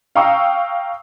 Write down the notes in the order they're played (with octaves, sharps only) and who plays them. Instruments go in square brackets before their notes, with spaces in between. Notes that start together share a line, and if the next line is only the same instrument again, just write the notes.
[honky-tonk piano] F5 G5 A#5 C#6 D#6 E6